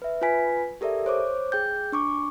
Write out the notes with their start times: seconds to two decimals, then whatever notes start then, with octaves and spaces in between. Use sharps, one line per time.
0.02 B4 E5
0.21 F4 B4 G#5 B6
0.81 G4 A4 A#4 D5 E5
1.06 C5 C#5 D6
1.52 G#4 G5 G6
1.92 D4 C#6 D6